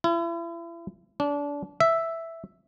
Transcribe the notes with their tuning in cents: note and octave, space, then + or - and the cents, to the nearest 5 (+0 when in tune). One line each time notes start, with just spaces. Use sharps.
E4 +40
D4 -25
E5 +0